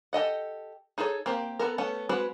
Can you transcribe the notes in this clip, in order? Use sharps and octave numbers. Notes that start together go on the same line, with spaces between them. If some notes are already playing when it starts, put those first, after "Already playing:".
G4 A4 D#5 F#5
D#4 G#4 A4 B4 C#5
A#3 C4 G4
B3 A4 A#4
A3 B3 C#4
G#3 C4 F#4 B4